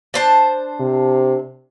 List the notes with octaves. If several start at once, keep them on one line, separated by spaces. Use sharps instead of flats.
D4 C5 A5
C3